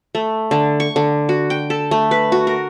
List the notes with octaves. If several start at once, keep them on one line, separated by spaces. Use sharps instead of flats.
A3
D3
C#6
D3
F#4
G5
A4
A3
B4
F#4
A#4